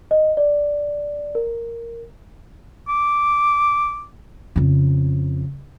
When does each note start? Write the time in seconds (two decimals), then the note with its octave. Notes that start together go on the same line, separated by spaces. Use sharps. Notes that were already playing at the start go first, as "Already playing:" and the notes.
0.11 D#5
0.37 D5
1.35 A#4
2.88 D6
4.56 F2 C#3